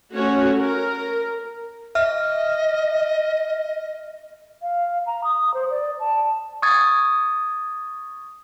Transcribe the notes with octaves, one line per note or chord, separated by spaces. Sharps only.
A3 C#4 F#4 C#5
A#4
D#5 E5 F6
F5
A#5
D#6
C5
D5
A5
C#6 D#6 G#6 A6